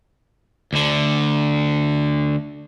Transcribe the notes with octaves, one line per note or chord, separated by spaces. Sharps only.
D2 D3